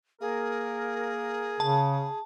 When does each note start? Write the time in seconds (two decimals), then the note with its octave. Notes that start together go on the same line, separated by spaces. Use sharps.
0.21 A#3 G#4 A#4
1.60 C#3 A5